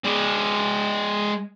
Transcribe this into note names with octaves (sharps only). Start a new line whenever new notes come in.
G#3 D5